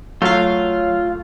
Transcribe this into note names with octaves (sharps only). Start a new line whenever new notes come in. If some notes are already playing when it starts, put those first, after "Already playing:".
F#3 A3 F4 F5